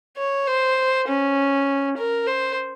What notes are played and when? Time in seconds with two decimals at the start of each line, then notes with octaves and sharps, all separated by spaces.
0.17 C#5
0.47 C5
1.08 C#4
1.98 A#4
2.27 C5